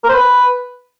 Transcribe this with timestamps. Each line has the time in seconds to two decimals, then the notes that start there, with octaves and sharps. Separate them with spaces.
0.04 A#4
0.09 C5
0.14 B4